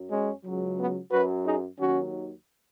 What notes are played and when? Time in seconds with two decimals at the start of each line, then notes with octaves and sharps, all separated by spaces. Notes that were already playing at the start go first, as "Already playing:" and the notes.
Already playing: F#2 F#3
0.11 G#3 C#4
0.45 C#2 C#3 F#3
0.79 B3
1.12 F#2 F#3 F#4 B4
1.45 D#4 G#4
1.79 D#2 D#3 F#3 C#4 F#4